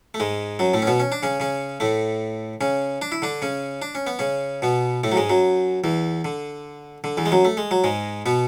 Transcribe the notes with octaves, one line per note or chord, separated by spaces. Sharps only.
A3
G#2 G#3
F#2 F#3
A2 A3
C#4
B2 B3
C#4
D4
C#3 C#4
C#3 C#4
A2 A3
C#3 C#4
D4
E4
D3 D4
C#3 C#4
D4
C#4
B3
C#3 C#4
B2 B3
A2 A3
F#3
G#2 G#3
F#2 F#3
E2 E3
D3
D3
E2 E3
G#3
F#2 F#3
A3
G#3
F#3
G#2 G#3
B2 B3